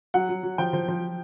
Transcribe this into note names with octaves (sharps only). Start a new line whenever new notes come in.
F#3 F#5
F#3
F#3
F3 G5
F3
F3